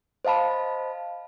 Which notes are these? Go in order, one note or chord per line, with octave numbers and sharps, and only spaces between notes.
C5 D#5 F5 A5 B5